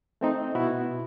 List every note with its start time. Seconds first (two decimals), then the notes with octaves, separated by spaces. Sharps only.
0.21 A3 C4 D#4
0.55 B2 B3 E4 F#4